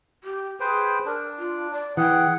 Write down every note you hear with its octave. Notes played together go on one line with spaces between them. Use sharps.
G4
G#4 B4 C5 G5
D4 A#4
F4
D5
E3 G#4 F#5 G5